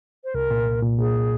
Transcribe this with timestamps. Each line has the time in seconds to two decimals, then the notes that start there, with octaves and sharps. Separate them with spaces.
0.24 C5
0.34 C2 A#4
0.51 A#2
0.67 C2
0.83 A#2
0.99 A#2 G#4